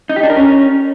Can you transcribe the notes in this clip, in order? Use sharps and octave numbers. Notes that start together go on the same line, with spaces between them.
D#4
G4
D4
A#4
C#4